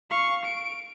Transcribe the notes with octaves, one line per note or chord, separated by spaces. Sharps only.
F5 C#6
D7